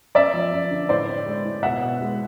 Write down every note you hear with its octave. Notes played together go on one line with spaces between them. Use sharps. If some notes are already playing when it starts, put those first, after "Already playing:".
F#2 D5 E5
F3
F#2
D3
A2 C5 D5
C4
G#3
A2
B2 E5 F#5
B2
G#3